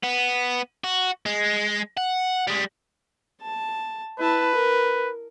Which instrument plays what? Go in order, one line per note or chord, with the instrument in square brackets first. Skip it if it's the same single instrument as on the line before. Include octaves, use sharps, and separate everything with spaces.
[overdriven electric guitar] B3
F#4
G#3
F#5
G3 G#3
[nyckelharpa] A5
[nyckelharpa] E4 A5 [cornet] B4
[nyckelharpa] A#4